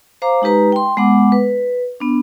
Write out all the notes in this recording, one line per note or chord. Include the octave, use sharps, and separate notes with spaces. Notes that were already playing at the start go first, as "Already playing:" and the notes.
C5 F5 A#5 D6
G#3 D#4 G4 B4 A#5
G5 C6
G#3 B3 F#5 D6
B4
B3 D4